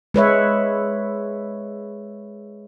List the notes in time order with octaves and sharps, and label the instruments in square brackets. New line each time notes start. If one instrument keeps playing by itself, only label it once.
[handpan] G#3 B4 C#5 E5